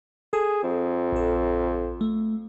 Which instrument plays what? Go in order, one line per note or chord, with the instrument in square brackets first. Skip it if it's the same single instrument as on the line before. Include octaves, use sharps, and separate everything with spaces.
[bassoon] G#4 [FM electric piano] A4
[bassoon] F2
[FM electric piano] A#1 A4
A3